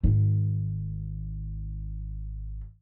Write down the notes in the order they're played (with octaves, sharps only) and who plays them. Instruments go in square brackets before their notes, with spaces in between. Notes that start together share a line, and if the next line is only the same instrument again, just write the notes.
[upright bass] G#1 D#3